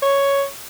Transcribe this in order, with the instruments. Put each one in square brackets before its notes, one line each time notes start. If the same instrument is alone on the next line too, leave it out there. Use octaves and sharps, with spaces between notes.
[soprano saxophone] C#5